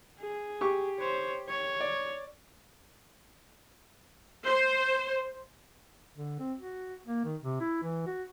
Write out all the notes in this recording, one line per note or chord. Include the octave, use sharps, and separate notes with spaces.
G#4
G4 C#6
C5 C#5
C#5
D5
C5
D3
C4
F#4
A#3
D#3
C3
E4
E3
F#4